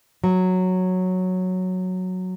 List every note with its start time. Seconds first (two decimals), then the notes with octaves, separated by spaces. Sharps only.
0.24 F#3